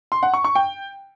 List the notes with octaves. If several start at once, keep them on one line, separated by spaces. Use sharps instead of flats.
C6
F#5
C#6
C#6
G5